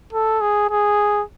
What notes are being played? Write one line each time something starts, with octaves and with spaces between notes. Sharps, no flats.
A4
G#4
G#4